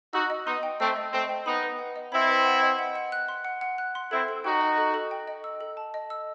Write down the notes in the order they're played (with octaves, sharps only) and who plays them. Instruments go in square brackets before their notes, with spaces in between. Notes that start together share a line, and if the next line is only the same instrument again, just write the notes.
[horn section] D#4 F#4 [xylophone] E6
[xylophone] D#5
[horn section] B3 D#4 [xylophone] C6
[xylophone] G5
[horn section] A3 C4 [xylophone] E6
[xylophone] D#5
[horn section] A3 C4 [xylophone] C6
[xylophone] G5
[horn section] B3 D#4 [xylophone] B5
[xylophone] B4
F#5
D#5
[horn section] C4 E4 [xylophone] B5
[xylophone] B4
F#5
D#5
F#5
F#5
F#6
C6
F#5
F#5
F#6
C6
[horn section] C4 E4 [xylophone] A4
[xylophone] A4
[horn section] D#4 F#4 [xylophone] G5
[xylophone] D#5
A4
A4
G5
D#5
E6
A4
A5
D#5
E6